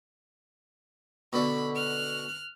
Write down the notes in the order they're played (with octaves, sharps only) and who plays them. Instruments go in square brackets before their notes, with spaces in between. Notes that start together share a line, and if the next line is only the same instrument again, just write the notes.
[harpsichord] B2 D3 D4 [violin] B5
[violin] F6 F#6